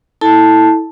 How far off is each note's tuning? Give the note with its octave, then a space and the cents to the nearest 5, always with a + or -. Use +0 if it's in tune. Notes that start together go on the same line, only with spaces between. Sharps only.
E4 -20 A4 +0 A5 +0